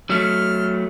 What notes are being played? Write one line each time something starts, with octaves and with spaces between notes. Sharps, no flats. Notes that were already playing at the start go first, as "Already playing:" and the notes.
F#3 A3 F6